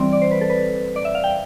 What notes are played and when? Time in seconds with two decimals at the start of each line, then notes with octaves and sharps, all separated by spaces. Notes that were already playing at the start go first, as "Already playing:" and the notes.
Already playing: E3 G3 C4 D5
0.13 D5
0.22 C5
0.31 B4
0.41 A4
0.50 B4
0.96 D5
1.05 E5
1.15 F5
1.24 G5